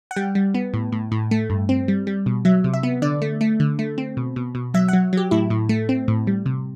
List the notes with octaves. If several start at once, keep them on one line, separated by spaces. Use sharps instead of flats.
F#5
G3 G5
G3
B3
A2
A2
A2
A3
G2
C4
G3
G3
B2
F#3 E5
C3
E5
B3
D3 D5
A3
A3
D3
A3
C4
B2
B2
B2
F#3 E5
F#3 F#5
F#3 G4
A2 E4
A2
A3
C4
A2
G3
C3